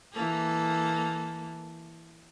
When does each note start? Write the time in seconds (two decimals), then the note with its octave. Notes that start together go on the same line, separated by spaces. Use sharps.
0.13 E3 A#3 A4